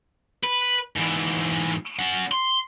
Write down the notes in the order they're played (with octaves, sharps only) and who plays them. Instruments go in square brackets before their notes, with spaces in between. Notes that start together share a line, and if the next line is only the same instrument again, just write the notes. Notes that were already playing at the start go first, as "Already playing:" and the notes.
[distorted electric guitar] B4
G#2 E3
C#4 F#5
C6